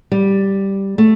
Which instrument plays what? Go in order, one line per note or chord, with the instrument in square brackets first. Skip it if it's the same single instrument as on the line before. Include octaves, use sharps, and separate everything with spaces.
[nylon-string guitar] G3
A3